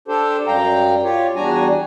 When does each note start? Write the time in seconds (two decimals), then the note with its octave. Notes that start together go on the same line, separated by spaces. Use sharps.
0.08 D4 G4 A4 C5
0.47 F#2 G3 F5 G5 A#5
1.04 F4 G4 C#5
1.36 E2 G3 D4 F#4 G#5 A#5